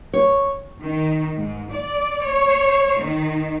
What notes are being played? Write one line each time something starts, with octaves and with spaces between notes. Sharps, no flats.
C#5
D#3
G#2
D5
C#5
D#3